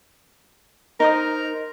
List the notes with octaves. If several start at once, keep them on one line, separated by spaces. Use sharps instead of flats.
D#4 A#4 C5 D#6